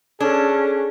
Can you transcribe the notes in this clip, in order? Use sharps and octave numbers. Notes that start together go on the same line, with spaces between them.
C#4 D4 G#4 A4